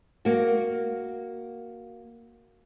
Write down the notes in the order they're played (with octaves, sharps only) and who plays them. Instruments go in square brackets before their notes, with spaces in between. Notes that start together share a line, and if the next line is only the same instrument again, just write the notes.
[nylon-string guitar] A#3 F#4